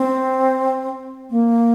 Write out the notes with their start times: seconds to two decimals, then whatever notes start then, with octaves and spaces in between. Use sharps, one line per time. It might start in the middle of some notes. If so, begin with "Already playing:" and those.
Already playing: C4
1.30 A#3